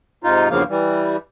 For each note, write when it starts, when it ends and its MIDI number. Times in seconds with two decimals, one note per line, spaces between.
0.24 0.48 44
0.24 0.48 48
0.24 0.48 63
0.24 0.48 65
0.51 0.63 40
0.51 0.63 43
0.51 0.63 49
0.51 0.63 53
0.51 0.63 58
0.51 0.63 77
0.69 1.17 52
0.69 1.17 55